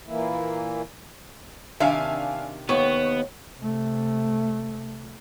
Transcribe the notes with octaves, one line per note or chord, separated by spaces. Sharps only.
A#2 E3 A#3 E4
C3 D#3 D4 E5 F5 G#5
D#2 B3 C#6
C3 A3